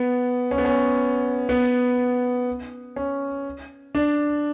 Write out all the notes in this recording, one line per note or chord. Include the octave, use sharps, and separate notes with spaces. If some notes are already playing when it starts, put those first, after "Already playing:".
Already playing: B3
C#4
B3
C#4
B3
C#4
D4